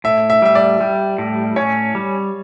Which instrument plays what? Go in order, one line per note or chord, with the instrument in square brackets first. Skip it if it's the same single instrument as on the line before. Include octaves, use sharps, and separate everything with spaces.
[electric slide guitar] A2 [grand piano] E5
[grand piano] E5
[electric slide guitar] G3 [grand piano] E5
[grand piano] D5
[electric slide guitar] G3
A2
[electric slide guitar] C#4 [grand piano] C#5
[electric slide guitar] G3